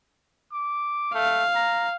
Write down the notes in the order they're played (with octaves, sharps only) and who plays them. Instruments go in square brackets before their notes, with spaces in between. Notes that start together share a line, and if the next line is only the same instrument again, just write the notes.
[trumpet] D6
[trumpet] A3 [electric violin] F5
[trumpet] A#5